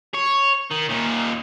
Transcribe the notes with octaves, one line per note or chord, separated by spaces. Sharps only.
C#5
D#3
D#2 A#2